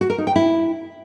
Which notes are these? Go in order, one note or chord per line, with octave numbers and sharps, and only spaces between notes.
F#4
A#4
D#4
G5
E4